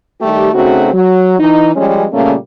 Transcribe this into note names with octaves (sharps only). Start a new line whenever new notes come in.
D#3 G3 A3 G4
C#3 A3 C4 D#4 F#4
F#3
E3 D#4
F3 G3 G#3 C#4
A#2 C#3 G3 A3 A#3 C#4